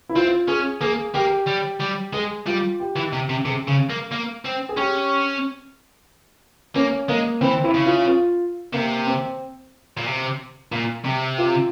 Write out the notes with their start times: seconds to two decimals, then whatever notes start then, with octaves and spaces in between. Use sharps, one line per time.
0.09 E4
0.16 C4 F4
0.48 C#4 G#4
0.81 A#3 G#4
1.14 A#3 G4
1.47 G3
1.81 G3
2.13 G#3 G#4
2.46 G3 F4
2.80 G4
2.96 E3
3.13 C3
3.30 C3
3.45 C3 G#4
3.68 C#3
3.90 A#3
4.11 A#3
4.45 C4
4.69 G#4
4.77 C#4 G4
6.76 A#3 C#4
7.09 G#3 A#3
7.41 E3 C4
7.64 E4
7.74 C#3
7.86 F4
8.08 F4
8.73 C3 A#3
9.06 C4
9.97 A#2
10.06 C3
10.72 A#2
11.05 C3
11.38 F4